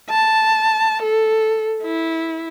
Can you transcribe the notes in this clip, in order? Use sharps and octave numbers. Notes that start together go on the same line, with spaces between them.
A5
A4
E4